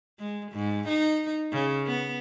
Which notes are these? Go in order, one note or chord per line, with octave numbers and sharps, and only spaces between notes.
G#3
G#2
D#4
C#3
B3